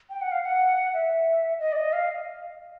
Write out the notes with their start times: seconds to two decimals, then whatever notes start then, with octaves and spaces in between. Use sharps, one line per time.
0.10 G5
0.21 F#5
0.32 F5
0.43 F#5
0.94 E5
1.60 D#5
1.72 D5
1.76 D#5
1.93 F5